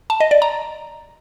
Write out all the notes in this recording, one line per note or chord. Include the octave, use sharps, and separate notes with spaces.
A5
D#5
D5
A#5